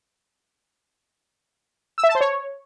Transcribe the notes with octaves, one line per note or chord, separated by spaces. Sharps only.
E6
E5
A5
C5
C#5